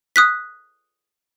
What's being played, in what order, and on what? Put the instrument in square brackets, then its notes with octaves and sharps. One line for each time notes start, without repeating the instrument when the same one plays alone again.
[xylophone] D#6 F#6 B6